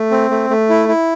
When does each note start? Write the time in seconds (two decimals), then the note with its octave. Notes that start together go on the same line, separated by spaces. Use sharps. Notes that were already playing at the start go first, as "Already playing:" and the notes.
Already playing: A3
0.11 C4
0.31 A3
0.50 A3
0.69 E4
0.89 E4